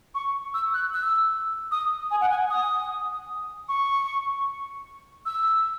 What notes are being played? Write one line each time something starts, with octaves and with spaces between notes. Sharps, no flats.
C#6
E6
F#6
E6
D#6
G#5
F#5
G#5
D#6
C#6
E6